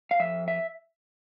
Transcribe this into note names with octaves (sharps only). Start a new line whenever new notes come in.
F5
F2 E5
E5